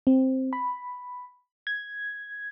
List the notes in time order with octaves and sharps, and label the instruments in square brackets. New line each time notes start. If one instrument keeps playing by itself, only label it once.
[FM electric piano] C4
B5
G#6